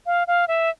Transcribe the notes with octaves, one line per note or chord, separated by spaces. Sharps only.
F5
F5
E5